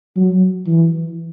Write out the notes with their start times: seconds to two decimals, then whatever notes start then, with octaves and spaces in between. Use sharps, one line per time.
0.17 F#3
0.67 E3